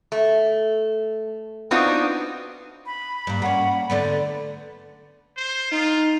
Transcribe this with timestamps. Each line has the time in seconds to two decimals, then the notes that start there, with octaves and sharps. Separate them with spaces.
0.12 A3
1.71 B3 C4 D4 D#4 F4 F#4
2.86 B5
3.27 G2 A#3
3.42 A#3 C#4 F#5
3.90 D3 A3 B3 D5
5.37 C5
5.71 D#4 F4